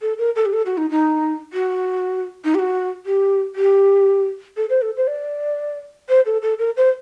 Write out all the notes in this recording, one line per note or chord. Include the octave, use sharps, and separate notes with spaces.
A4
A#4
A4
G4
A4
F#4
D#4
D#4
F#4
D#4
G4
F#4
G4
G4
A4
C5
A4
C5
D5
C5
A4
A4
A#4
C5